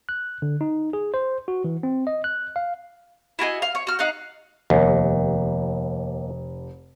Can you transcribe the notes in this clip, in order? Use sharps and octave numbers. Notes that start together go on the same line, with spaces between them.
F#6
D3
D#4
G#4
C5
F#4
E3
C4
D#5
F#6
F5
E4 F#4 G#4 D#5
F5
C#5
F#4 F6
D#4 F5 F#5 F#6
F1 D#2